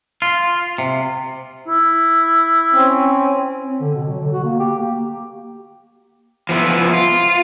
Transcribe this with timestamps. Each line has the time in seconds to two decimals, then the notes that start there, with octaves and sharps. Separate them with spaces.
0.22 F4
0.78 C3
1.68 E4
2.72 C4 C#4
3.63 C4
3.80 D3
3.95 B2
4.08 F#3
4.20 D3
4.33 F#4
4.44 A#3
4.59 G4
4.79 A#3
6.49 F3 B3 E4
6.94 F4